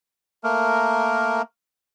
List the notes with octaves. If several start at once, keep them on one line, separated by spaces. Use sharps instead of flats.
A3 A#3 A#4